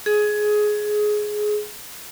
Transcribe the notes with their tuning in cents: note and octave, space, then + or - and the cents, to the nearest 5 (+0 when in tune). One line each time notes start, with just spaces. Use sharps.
G#4 +15